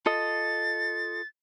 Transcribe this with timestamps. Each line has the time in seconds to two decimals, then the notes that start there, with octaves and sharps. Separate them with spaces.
0.06 F4 A4 D#5 A6